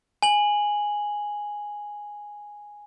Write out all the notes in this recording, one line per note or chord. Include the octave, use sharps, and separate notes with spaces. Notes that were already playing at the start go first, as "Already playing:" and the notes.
G#5 F#7